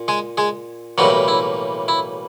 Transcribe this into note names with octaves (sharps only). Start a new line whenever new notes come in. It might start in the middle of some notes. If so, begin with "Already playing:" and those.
Already playing: A#2
G#3 G#4
G#3 G#4
B1 A2 E3 F#3 G3 A#3 F#4
E4
E4